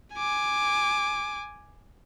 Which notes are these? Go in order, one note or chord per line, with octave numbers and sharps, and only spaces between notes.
G#5 D6